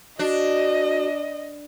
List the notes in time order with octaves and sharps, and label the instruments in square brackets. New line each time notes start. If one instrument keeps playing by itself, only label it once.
[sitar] D4 [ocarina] F#4 [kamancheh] D#5